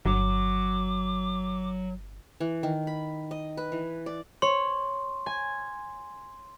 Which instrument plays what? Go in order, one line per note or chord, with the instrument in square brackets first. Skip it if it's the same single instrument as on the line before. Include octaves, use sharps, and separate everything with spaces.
[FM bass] G1 [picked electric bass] F#3 [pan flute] D6
[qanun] E3
D#3
B5
D#5
B4
E3
D5
[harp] C#5 [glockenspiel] C6
[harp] G#5